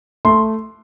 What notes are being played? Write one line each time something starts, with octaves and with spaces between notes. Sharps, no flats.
A3 C6